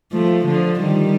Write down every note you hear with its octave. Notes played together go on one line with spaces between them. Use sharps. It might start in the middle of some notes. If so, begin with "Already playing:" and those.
F3 A3
D3 F3
D#3 G3